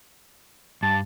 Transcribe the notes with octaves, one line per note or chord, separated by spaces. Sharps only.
G2 A5